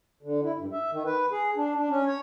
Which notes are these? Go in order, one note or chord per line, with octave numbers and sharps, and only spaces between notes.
D3
E4
G2
E5
D#3
B4
G#4
D4
D4
C#4
C#5